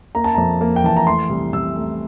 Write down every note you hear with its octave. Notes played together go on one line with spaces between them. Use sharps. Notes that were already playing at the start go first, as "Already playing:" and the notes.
A#3 A#5
A5
F2 A#5
A#3
G5
E3 A5
A#5
A3 C6
C2
C2 E6
A3